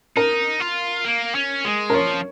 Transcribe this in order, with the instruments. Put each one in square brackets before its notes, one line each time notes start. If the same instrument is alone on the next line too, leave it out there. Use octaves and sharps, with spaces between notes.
[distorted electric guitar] D#4 [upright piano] A#4
[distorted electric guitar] F4
A#3
C#4
G#3
[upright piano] A#4
[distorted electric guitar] F3 [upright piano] C#5